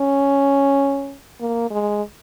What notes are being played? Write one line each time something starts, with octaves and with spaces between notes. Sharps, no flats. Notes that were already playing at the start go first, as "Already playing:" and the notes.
Already playing: C#4
A#3
G#3